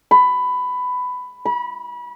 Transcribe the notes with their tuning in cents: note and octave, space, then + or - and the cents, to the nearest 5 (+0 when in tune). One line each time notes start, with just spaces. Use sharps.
B5 +15
B5 -30